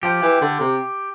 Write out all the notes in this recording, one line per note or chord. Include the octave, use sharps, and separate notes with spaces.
F3 G4
E3
D3
C3